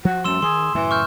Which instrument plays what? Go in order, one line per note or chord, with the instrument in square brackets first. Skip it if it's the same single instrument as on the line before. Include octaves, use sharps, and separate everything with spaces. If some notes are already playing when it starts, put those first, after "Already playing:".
[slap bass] F3 [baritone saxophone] F#4
[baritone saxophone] F#2 [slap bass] F3 G3 A3 [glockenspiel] C6 E6 E7
[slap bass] D#3 [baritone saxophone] G#4 [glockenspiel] C6
[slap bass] F#2 A2 C#3 [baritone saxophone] E3
[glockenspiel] C#6 F6 G6